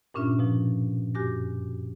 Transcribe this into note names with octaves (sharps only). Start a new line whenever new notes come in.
G2 A#2 C#4 D4 F4 E5
B2 F3
F#2 F#4 G4 G#5 D6 A#6